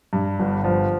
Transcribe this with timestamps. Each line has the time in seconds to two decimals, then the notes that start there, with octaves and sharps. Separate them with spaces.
0.13 G2
0.39 G1
0.64 F3